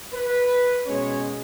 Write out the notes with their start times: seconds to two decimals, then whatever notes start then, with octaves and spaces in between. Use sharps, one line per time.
0.13 B4
0.86 B2 G#3 C#4 C#5